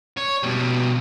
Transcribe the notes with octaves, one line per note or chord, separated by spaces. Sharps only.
C#5
B2 G3